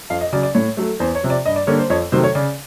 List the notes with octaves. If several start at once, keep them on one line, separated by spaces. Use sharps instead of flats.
F2 F5
D#5
C#3 F#3 D5
D5
A2 C#5
F#3 A3
E2 C5
C#5
C3 F3
D5
G2 D#5
D5
D3 G3 A#3 C#5
C5
F2 C#5
C3 D#3 F#3 A3 C5
C#5
C#3 D5